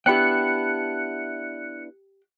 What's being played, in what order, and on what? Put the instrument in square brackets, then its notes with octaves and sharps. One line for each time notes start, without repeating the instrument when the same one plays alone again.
[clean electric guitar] B3 D4 E4 [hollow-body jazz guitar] G4 F#5 G5 [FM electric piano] F#6 C#7